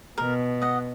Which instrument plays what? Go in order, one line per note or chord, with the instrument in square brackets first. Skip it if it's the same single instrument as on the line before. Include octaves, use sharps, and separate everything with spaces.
[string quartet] B2 [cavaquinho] A#4
[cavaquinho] D#5 F#5